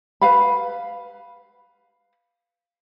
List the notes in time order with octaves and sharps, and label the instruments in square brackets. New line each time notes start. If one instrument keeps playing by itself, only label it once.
[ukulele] B4 F5 B5